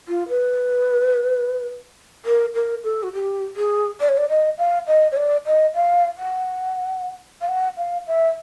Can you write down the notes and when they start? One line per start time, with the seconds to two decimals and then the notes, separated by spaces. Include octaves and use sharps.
0.08 F4
0.29 B4
2.25 A#4
2.55 A#4
2.84 A4
3.03 F#4
3.13 G4
3.56 G#4
4.01 D5
4.09 C#5
4.17 D5
4.30 D#5
4.58 F5
4.87 D#5
5.12 C#5
5.17 D5
5.46 D#5
5.75 F5
6.18 F#5
7.41 F5
7.49 F#5
7.77 F5
8.07 E5